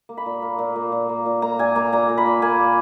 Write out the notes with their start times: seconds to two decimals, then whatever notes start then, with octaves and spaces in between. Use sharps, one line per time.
0.09 A#3
0.17 B5
0.26 A#2
0.42 A#3
0.59 A#2
0.76 A#3
0.92 A#2
1.09 A#3
1.26 A#2
1.42 A#3 A#5
1.59 A#2 G#5
1.75 A#3 A#5
1.93 A#2 A#5
2.09 A#3
2.18 B5
2.26 A#2
2.42 A#3 G#5
2.60 A#2